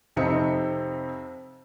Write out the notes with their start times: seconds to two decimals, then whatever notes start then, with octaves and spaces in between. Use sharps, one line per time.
0.16 F2 C3 C4 D#4 E5 C#7